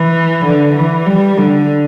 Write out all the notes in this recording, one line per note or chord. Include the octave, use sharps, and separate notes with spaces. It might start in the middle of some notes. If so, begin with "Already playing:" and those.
Already playing: E3
D3
E3
G3
D3